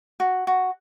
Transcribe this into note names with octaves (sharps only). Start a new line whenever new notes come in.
F#4
F#4